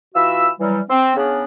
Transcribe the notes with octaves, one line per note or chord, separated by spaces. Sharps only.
E3 F4 F#4 E5 B5 E6
E3 F#3 G3
C4
C#3 B3 C#4 D4